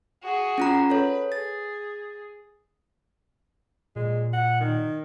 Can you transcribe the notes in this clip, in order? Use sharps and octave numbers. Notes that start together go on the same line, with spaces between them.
F#4 G#4
C#4 F4 A#5
A4 B4 C#5
G#4 A6
A#2 G#3
F#5
D#3